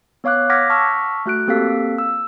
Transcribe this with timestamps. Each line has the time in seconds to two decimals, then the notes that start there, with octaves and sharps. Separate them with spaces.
0.24 B3 C#5 F5 D6 F#6
0.50 F#5 D6 F6 G#6 A#6 B6
0.70 A5 C#6 E6 F6 B6
1.26 A3 F#4 F#6 D7
1.48 A#3 C4 G4 A4 F5 B6
1.98 E6